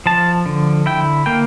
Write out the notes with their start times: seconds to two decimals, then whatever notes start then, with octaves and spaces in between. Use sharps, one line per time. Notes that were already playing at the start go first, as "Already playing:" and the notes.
0.06 F3 A5
0.46 D3
0.86 E4 G5
1.26 A#3 G5